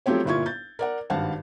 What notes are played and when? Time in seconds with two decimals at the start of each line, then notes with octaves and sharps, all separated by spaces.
0.06 F3 F#3 A3 C4 G4 C#5
0.25 G1 A#2 E4 F4 C#6 G#6
0.46 G6 A6
0.79 A#4 D5 F#5
1.10 G#1 G2 F5 F#5 A5